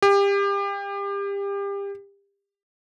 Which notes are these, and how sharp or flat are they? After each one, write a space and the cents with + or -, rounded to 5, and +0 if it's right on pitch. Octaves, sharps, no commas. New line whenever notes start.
G4 +30